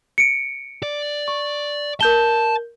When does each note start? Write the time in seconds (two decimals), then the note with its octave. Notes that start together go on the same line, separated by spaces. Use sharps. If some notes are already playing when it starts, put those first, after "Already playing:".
0.18 C#7 D7
0.83 D5
1.28 C#6
2.01 A#4 A5 G6 G7